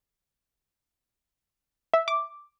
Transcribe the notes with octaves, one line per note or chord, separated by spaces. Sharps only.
E5
D6